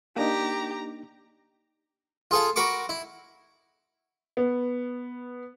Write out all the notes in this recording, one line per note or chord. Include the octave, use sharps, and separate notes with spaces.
A#3 D4 D#4 G4 A#5
F4 G#4 A4 F5
F#4 A#4 B5 C#6 D6
E4
B3